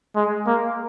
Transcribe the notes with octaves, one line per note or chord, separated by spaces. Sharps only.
G#3
A#3